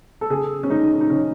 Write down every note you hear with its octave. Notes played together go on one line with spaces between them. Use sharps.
A4
C#3 G#4
C#4
G#3 D#4
D#4
C#3 C#4